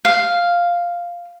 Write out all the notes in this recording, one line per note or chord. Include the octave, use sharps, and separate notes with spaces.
F5